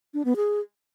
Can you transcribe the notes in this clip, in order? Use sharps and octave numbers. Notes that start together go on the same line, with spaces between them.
D4
B3
G#4